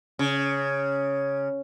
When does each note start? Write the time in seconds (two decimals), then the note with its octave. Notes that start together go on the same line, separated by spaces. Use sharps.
0.19 C#3